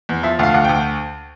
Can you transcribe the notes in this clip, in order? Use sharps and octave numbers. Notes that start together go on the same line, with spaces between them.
E2
F3 E5
D2 F5
D2 F#5
D2 G5